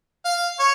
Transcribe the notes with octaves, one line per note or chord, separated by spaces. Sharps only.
F5
C#5